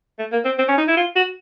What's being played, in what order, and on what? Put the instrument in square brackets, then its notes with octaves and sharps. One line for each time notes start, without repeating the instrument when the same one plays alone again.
[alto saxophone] A3
A#3
C4
C4
C#4
D#4
E4
F4
F#4